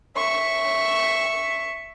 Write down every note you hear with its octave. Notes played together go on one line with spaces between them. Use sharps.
E5 C#6